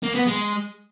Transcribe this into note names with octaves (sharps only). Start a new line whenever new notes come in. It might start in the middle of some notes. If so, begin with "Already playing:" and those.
A#3
B3
G#3